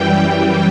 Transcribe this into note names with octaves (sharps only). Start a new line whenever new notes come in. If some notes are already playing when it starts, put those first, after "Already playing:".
Already playing: F#2 E3 G3 G5